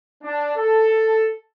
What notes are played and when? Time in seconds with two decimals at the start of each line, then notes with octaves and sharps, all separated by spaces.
0.23 D4
0.56 A4